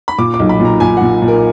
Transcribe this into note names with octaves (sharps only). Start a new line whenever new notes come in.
B5
A#2 D6
D6
B1
B5
A#2
A#5
A#2 G#5
A#2 F#5
A#2
A#4